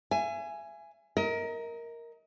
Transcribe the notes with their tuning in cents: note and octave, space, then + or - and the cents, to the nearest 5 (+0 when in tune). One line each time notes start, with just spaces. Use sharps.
E5 +40 G#5 +0
A#4 +0 D#5 +35